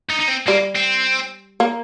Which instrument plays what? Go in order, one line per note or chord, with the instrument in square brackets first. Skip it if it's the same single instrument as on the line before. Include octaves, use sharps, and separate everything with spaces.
[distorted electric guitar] D#4
D#4
C4
[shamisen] G3 [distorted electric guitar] A#3
[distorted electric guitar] C4
[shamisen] A#3